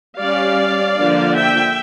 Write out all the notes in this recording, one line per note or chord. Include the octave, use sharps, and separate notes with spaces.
G3 C#4 D5 F5
D3 F3 A#3 D4
E5 G5